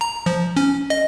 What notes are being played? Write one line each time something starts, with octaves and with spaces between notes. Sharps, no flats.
A#5
F3
C#4
D#5